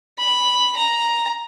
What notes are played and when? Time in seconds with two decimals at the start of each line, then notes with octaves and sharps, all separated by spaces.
0.19 B5
0.76 A#5